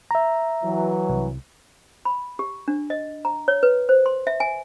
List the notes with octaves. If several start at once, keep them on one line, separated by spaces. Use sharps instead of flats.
E5 A#5
E3 F#3
C2
B5
G4
D4
D#5
A#5
C#5
B4
C5
C6
E5
G#5